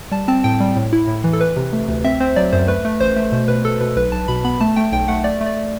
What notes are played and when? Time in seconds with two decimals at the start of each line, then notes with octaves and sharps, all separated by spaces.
0.12 G3 A5
0.28 C4 A5
0.44 A2 G5
0.60 G3
0.76 A2
0.93 E4
1.08 A2
1.24 E3
1.33 A4
1.40 E3 B4
1.56 C3
1.73 A3
1.88 D2
2.04 C4 E5
2.20 C4 C5
2.36 F#3 D5
2.52 F#2 C5
2.68 A3 B4
2.85 A3
3.00 A1 C5
3.16 A3
3.32 B2 C5
3.48 B2 B4
3.64 B2 A4
3.81 B2 B4
3.96 B1 B4
4.12 B1 A5
4.28 B2 B5
4.44 B3 B5
4.61 A3 A5
4.76 A3 G5
4.92 B1 G5
5.08 A3 F#5
5.24 A3 D5
5.41 A3
5.46 D5
5.57 A3